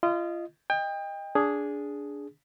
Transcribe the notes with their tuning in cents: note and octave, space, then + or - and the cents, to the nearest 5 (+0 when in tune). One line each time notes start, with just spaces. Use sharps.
F4 -30 D#5 -5
D#5 +0 G5 +30
D4 -15 G#4 +0